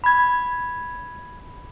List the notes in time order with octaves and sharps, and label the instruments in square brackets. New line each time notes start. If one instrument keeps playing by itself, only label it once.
[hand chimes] B5 G#6